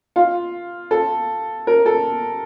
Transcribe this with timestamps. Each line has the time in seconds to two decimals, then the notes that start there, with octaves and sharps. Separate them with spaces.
0.16 F4
0.91 A4
1.67 A#4
1.86 A4